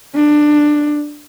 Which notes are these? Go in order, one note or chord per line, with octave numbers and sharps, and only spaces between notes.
D4